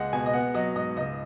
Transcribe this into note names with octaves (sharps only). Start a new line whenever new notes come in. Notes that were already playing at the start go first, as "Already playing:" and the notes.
Already playing: C#2 G#3 D#5 F#5
B2 G#5
D#5
B3 F#5
F#3 D#5
G#2 D#5
C#2 D#5